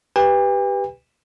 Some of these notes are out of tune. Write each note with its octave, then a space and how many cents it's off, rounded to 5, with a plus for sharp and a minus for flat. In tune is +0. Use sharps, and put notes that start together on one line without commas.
G4 +0 B4 +0 G5 +45